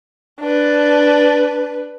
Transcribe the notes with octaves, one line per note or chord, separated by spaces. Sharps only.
D4 B4